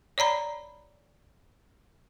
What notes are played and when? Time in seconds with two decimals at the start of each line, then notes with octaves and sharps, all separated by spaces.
0.18 C#5 D5 A#5 B5